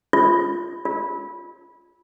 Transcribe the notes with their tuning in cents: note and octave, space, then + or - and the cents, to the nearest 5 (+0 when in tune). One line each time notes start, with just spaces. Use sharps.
F4 -5
F4 +15